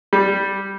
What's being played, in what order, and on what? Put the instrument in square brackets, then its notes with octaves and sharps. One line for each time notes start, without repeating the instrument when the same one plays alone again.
[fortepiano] G3